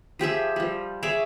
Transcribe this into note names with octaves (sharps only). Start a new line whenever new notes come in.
F3 G4 G#4 E5
F3 G3
G#4 C#5 E5 D6